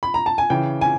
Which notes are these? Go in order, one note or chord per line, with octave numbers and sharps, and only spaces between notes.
B5
A#5
A5
G#5
C#3 E3 G5
G#5